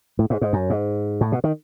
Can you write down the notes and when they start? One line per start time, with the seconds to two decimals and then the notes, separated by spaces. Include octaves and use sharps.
0.19 A2
0.30 G#2
0.41 G#2
0.53 F#2
0.70 G#2
1.21 A2
1.32 B2
1.44 D#3